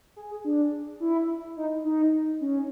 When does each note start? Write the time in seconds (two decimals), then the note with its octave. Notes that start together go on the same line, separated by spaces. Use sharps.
0.16 G#4
0.31 G#4
0.45 D4
1.00 E4
1.57 D#4
1.85 D#4
2.41 C#4